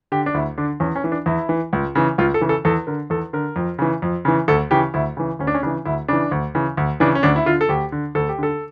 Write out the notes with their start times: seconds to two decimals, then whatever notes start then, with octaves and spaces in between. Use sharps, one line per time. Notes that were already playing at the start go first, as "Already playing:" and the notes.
0.12 D3 G4
0.26 D4
0.34 D2 E4
0.58 D3 D4
0.80 E2 C#4
0.96 C#4
1.04 E3
1.12 D4
1.26 E2 E4
1.49 E3
1.73 C#2
1.95 C#3 E3
2.18 C#2 F4
2.34 A4
2.41 C#3 E3
2.49 A4
2.65 E2 A4
2.87 D3 A#4
3.10 E2 A4
3.33 D3 A#4
3.56 F2
3.79 C#3 E3
4.02 F2
4.25 C#3 E3
4.48 D2 A4
4.71 C#3 E3 G4
4.94 D2 E4
5.17 C#3 E3
5.39 D2 C#4
5.47 D4
5.54 C#4
5.63 C#3 E3 D4
5.85 D2 E4
6.08 C#3 E3 D4
6.31 D2
6.55 C#3 E3
6.77 D2
7.00 C#3 E3 D4
7.15 C#4
7.23 D2 D4
7.36 E4
7.46 D3 F4
7.61 A4
7.69 D2 G4
7.92 D3
8.15 D2 A4
8.29 G4
8.38 D3 A4